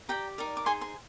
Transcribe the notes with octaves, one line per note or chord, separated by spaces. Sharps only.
G4 D5 G5 A#5
D#4 A#4 D5
D6
D#4 G#4 C5 G#5 C6
G#5 C6